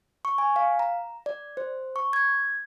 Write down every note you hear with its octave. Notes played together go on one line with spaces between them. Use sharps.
C#6
G#5
F5
A#5
D5
C5
C#6
G#6